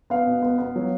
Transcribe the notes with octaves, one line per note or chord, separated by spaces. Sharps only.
B3 F5
B2
B3
B3
F#3